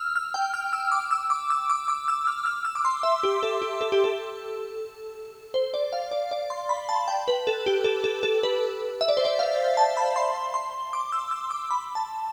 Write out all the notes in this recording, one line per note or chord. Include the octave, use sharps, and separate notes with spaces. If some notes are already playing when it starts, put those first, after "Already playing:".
Already playing: E6 F6
F6
G5
F6
E6
D6
E6
D6
E6
D6
D6
E6
F6
F6
E6
D6
C6
E5
G4
A4
G4
A4
G4
A4
C5
D5
F5
D5
D5
C6
B5
A5
G5
B4
A4
G4
A4
A4
A4
B4
E5
D5
C5
D5
F5
A5
B5
C6
C6
D6
E6
E6
D6
B5
A5